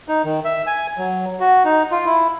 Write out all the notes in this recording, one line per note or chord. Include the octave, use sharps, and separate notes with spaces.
D#4
D#3
E5
G#5
F#3
F#4
D#4
F4
E4